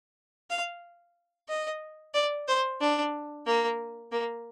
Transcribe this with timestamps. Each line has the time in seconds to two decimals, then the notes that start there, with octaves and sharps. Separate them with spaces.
0.50 F5
1.49 D#5
2.14 D5
2.48 C5
2.81 D4
3.46 A#3
4.12 A#3